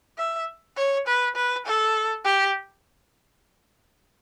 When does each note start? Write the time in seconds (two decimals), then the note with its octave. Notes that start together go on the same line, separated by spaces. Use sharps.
0.18 E5
0.77 C#5
1.07 B4
1.36 B4
1.66 A4
2.25 G4